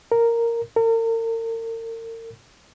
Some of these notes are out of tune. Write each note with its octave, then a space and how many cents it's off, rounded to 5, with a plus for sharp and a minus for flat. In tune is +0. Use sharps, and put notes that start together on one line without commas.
A#4 -5
A#4 -40